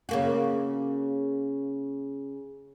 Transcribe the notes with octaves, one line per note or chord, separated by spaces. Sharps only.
C#3 A#3 F#4